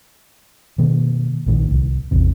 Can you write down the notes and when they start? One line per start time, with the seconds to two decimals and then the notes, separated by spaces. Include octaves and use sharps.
0.78 B2 D#3 A#3
1.46 A#1 A2 D#3
1.71 C2
2.11 A1 E2 C3